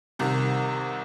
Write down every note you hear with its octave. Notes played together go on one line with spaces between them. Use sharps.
C2 C3 D#3